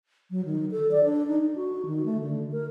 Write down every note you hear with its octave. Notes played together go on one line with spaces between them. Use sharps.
F#3
D#3
A4
D5
D4
D#4
F#4
D#3
A3
D3
A#4